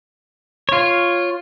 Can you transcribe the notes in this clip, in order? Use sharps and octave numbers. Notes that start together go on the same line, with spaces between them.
F4 C#5